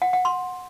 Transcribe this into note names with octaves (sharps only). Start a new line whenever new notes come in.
F#5
F#5
C6